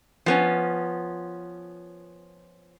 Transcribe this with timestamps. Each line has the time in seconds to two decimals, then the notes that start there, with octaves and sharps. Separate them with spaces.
0.26 F3 B3 C#4